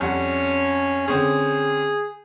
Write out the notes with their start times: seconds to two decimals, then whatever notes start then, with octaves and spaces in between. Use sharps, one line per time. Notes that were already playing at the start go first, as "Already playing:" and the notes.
0.01 F2 G3 C#4 F#5
1.08 D3 C4 C#4 G#4